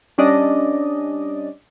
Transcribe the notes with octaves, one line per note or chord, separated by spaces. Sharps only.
G3 C#4 D4 D5 D#5